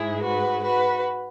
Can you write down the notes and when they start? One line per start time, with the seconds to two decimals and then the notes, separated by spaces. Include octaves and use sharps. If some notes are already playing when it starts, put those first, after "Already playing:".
Already playing: G#2 G#3 E4 G#4
0.21 F#4 B4
0.63 F#4 B4